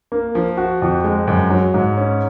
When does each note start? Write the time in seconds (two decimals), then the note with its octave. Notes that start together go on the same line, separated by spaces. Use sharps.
0.12 A#3
0.35 F3
0.57 F#4
0.82 F2
1.04 G#3
1.27 F#2
1.50 F#3
1.74 G#2
1.97 C#4